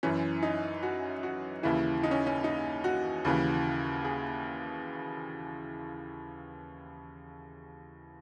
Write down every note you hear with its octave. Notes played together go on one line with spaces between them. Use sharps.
F#2 E3 C#4
D#4
F#4
F#4
D#2 C#3 E3 E4
D#4
C#4
C#4
D#4
F#4
D#2 C#3 E3
G#4